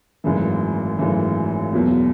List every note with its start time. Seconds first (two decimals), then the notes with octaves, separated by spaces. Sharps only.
0.24 G#1 F#2 C#3 E3 A3
0.98 G#1 F#2 C#3 E3 A3
1.72 E2 B2 F#3 A#3